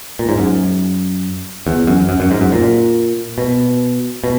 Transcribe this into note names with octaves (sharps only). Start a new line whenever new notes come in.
A#2
G#2
F#2
E2
F#2
F#2
F#2
G#2
F#2
A#2
B2
B2